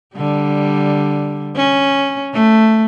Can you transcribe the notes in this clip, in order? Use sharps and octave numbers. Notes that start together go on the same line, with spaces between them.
D3 G3
C#4
A3